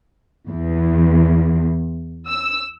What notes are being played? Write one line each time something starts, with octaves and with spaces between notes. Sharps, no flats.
E2
E6